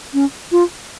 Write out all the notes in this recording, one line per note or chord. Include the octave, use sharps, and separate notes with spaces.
C#4
F4